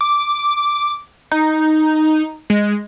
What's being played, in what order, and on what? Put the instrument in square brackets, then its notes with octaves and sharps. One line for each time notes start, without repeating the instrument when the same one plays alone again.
[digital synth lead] D6
D#4
G#3